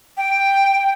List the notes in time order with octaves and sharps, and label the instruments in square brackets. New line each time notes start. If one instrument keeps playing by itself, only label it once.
[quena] G5